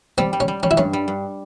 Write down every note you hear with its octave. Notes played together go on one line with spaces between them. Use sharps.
G3 C4
G3
C#4
G3
G3 C#4
E4
G2 C#4
G3
G2